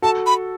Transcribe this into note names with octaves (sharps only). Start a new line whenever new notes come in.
F#4 A4 A5
B5